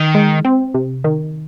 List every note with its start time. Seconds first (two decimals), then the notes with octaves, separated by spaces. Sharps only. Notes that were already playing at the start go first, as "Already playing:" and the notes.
Already playing: D#3
0.15 G#3
0.45 C4
0.74 C3
1.04 D#3